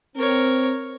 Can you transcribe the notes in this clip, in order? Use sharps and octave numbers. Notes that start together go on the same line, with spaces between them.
C4 A#4 C#5